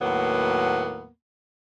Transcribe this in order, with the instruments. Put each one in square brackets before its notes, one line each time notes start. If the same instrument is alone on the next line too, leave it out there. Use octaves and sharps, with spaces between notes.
[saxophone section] D#2 A2 F#3 A#3 B3